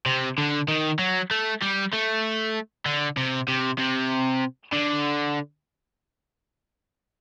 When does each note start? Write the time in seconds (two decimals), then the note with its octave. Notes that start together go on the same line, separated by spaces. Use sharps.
0.06 C3
0.38 D3
0.68 D#3
0.99 F#3
1.31 A3
1.62 G3
1.93 A3
2.86 D3
3.17 C3
3.48 C3
3.79 C3
4.72 D3